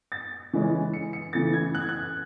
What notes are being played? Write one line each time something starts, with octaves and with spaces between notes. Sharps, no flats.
A6
C#3 E3 G#3 C#4
C#7
C#7
C#3 E3 A3 A6
G#6
F#6
G#6
F#6